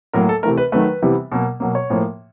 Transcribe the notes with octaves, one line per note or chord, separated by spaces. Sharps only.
A2 F#3 A#3 A#4
A4
C3 E3 A3 A#4
B4
D#3 F#3 A3 B4
C3 E3 G3 B3
B2 F#3 A#3
B2 F#3 A#3
C#5
A2 F3 A#3